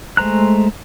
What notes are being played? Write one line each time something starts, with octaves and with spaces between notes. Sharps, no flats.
G#3 A3 C5 A#5 F#6